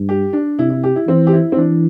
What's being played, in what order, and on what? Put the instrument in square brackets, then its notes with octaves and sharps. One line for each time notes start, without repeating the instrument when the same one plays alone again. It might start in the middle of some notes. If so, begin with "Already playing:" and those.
Already playing: [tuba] G2
[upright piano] G4
D4
[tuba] C3 [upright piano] E4
[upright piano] E4
G4
E4
[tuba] E3 [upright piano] C4
[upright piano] G4
E4
C4
[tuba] E3 [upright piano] D4